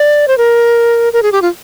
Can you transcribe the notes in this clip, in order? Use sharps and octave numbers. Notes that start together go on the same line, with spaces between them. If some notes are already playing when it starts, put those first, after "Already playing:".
Already playing: D5
C5
A#4
A#4
G#4
G4
F4